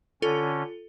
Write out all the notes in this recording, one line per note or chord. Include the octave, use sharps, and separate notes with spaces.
D3 C#4 F4 A4